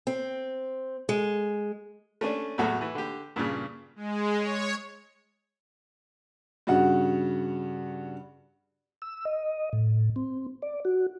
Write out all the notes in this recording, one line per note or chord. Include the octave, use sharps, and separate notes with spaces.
C4
G#3
A3 C#4 D4
E2 A2 F#3 F#4 A4
E3
D3 G4
G2 A#2 C#3
G#3
C#5
G2 C#3 F#4 F#5
E6
D#5
A2
C4
D5
F#4